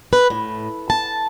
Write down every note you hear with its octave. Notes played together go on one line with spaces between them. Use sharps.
B4
A2
A5